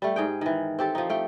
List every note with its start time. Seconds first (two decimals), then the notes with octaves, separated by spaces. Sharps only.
0.02 G3 A3
0.16 G#2 G#4 G5
0.41 D#3 E3
0.79 C4 G4 A4
0.95 F3 D#4
1.10 A3 G5